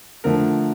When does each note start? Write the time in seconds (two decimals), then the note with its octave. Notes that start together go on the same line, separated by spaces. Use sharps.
0.24 D3 F3 A3 A#4